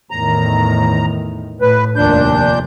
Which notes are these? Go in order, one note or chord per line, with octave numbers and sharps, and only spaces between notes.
E2 A2 D#3 A#5
A2 B4
F1 D#2 A#2 D4 G6